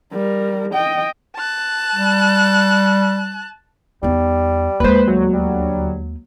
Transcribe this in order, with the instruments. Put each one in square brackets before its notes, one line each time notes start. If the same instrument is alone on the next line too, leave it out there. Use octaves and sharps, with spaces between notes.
[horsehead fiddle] G3 A#4
D#5 G5
[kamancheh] A5 F#6
[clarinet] G3
[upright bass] E2 D#4 [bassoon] G3
[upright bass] D#2 G#3 [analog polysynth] B4 C5
[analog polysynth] D2 F#3
[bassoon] G3